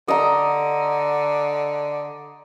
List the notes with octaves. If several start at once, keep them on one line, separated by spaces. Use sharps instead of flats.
D3 D#5 A#5